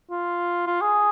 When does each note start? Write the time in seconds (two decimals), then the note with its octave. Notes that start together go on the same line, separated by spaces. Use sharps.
0.11 F4
0.67 F4
0.81 G#4